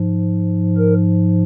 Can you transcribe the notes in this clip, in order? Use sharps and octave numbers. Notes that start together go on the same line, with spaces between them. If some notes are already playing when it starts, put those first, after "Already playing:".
Already playing: G#2 F3
A#4